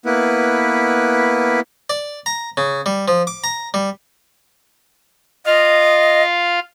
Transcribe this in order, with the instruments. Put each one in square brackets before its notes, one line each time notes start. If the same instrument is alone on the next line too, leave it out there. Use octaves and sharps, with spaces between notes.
[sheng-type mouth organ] A#3 B3 E4 B4
[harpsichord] D5
A#5
C#3
G3
F3
D6
A#5
G3
[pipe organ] F4 F5 [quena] D#5